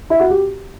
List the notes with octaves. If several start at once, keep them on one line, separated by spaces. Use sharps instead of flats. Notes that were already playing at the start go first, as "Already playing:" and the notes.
E4
F#4
G4